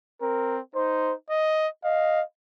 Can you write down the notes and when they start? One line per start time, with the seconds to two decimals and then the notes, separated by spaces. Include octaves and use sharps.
0.21 C4 A#4
0.75 D#4 C5
1.30 D#5
1.84 D#5 F5